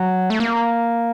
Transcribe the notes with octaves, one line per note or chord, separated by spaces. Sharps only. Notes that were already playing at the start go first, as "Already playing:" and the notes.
Already playing: F#3
A3
A#3